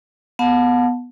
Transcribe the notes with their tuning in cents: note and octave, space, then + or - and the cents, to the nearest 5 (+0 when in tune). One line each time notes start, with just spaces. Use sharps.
B3 +0 F#5 -45 A5 +0